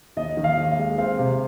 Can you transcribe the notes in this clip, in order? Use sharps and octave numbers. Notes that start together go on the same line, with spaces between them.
D#2 D#5
D#3
F5
D#2
F5
G#3
C4 F5
C3